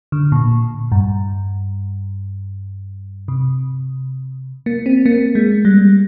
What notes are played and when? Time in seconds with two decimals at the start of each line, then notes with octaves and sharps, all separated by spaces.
0.12 D3
0.32 A#2
0.92 G2
3.28 C3
4.66 A#3
4.86 C4
5.06 A#3
5.35 G#3
5.65 G3